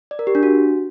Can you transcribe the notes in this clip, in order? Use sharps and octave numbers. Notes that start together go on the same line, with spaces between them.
D5
A#4
G4
D4
F#4